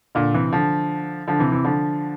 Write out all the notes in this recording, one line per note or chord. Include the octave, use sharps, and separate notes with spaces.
A#2 D3
C3 E3
D3 F3
D3 F3
C3 E3
C3 E3
D3 F3